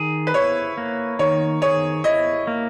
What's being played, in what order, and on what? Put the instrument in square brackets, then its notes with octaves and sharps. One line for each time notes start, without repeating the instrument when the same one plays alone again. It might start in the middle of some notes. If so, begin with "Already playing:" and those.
Already playing: [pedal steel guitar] D#3 G#4
[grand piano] B4
[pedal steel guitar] E4 [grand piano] C#5
[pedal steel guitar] A#3
[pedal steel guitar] D#3 [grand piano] C#5
[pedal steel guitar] G#4 [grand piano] C#5
[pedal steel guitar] E4 [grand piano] D#5
[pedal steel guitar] A#3